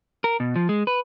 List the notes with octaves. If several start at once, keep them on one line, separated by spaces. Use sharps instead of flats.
A#4
B2
F3
G#3
B4